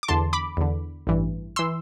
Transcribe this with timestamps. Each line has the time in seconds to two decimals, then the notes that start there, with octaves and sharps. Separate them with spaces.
0.03 D6
0.08 E2 D3 A5 C6
0.33 B5 D6
0.57 E2 D3
1.07 A1 G2 E3
1.56 E3 C6 E6